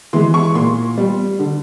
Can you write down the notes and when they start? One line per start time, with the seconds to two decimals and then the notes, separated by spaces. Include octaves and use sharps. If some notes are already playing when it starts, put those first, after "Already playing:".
0.13 E3 G#3 C6
0.34 C#6
0.54 A#2 C6
0.98 G3
1.39 D3